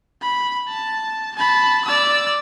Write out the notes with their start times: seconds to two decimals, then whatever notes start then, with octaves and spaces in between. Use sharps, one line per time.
0.22 B5
0.68 A5
1.36 A5 B5
1.85 D5 E6